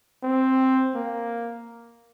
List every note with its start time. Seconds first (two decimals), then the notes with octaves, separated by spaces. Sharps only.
0.23 C4
0.95 A#3